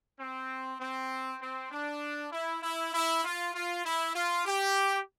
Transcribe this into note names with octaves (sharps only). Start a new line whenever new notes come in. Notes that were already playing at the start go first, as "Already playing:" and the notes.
C4
C4
C4
D4
E4
E4
E4
F4
F4
E4
F4
G4